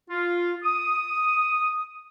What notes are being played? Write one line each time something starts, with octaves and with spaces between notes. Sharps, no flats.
F4
D#6